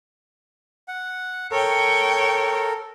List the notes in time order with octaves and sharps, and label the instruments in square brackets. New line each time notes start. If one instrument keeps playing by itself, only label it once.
[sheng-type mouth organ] F#5
[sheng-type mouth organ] A4 A#4 [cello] C#5 G5